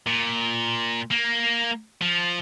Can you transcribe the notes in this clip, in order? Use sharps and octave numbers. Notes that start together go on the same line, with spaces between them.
A#2
A#3
F3